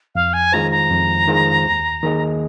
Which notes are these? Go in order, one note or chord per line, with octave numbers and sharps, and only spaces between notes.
F2 F5
G#5
D#3 G#3 F4 C5 A#5
A#5
F2
D#3 G#3 F4 C5
D#2
D#3 A#3 G#4 D#5